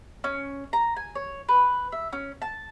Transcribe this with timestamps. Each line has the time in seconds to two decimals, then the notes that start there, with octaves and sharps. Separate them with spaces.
0.24 C#4
0.73 A#5
0.96 G#5
1.15 C#5
1.49 B4
1.92 E5
2.13 C#4
2.42 A5